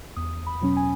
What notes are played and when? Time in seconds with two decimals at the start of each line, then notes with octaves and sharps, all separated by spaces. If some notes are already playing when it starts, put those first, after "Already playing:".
0.16 E2 D#6
0.47 B5
0.61 B2 F#3 C#4
0.77 G#5